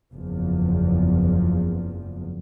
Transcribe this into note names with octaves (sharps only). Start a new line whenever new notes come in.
F#1 E2 F3